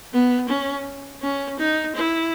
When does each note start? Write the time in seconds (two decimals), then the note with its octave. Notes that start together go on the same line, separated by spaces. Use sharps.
0.13 B3
0.48 C#4
1.22 C#4
1.59 D#4
1.95 E4